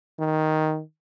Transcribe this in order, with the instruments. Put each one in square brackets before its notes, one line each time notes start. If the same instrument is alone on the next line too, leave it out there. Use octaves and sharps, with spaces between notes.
[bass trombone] D#3